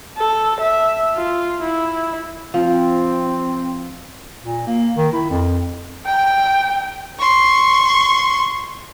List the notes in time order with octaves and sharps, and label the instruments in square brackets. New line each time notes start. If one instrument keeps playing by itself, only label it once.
[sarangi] A4
E5
F4
E4
[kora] F3 [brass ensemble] C4
[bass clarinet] A#2
A#3
D#3
E4
F2
[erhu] G5
[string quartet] C6 C#6